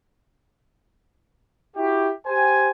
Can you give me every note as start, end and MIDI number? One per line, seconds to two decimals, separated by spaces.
1.77 2.10 64
1.77 2.10 66
1.77 2.10 67
2.27 2.70 67
2.27 2.70 72
2.27 2.70 80